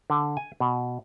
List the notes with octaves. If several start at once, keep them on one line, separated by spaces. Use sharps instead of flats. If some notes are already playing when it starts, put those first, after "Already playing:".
D3
G#5
B2